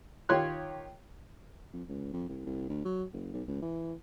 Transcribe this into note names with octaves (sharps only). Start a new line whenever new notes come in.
D#3 F4 G4 C#5 C6 F#6
F2
C#2
F2
C2
C2
D2
F#3
F#1
B1
C#2
E3